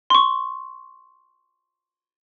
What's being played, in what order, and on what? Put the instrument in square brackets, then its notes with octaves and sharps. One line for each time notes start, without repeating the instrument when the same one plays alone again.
[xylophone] C6 C#6